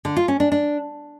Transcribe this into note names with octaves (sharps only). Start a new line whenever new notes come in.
D3
F4
C#4
D4
D4